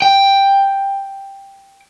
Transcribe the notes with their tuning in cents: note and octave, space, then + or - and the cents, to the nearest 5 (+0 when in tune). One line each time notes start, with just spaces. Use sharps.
G5 +5